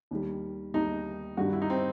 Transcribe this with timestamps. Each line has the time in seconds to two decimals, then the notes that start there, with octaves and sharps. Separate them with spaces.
0.11 D#2 D#3 G3
0.74 D#2 D#3 G3 D#4
1.37 G2 D#3 G3 F#4
1.53 E4
1.62 D#4
1.70 C4